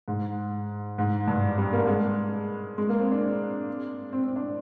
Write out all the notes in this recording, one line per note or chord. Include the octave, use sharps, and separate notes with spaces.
G#2
G#2
G2
G3
A#3
G#3
G#3
A#3
C4
D4
C4
C4
D4